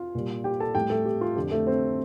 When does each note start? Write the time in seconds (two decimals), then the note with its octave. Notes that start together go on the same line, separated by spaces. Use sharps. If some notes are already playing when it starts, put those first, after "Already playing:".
Already playing: F4 F5
0.15 A#2 G3
0.44 G4 G5
0.60 A4 A5
0.75 A2 G3 G4 G5
0.90 A3 A4
1.06 G4
1.21 F4
1.36 F2 D3 F3 G4
1.51 A3 A4
1.67 C4 C5